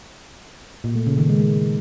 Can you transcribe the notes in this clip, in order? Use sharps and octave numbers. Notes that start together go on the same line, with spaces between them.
A#2
A3
C#3
D#3
G#3